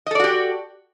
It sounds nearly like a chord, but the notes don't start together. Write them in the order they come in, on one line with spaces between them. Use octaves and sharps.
D#5 A4 D5 F#4 G4